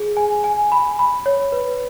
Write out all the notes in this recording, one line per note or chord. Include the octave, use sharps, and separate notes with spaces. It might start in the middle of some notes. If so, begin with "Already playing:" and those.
Already playing: G#4
G#5
G#5
B5
B5
C#5
B4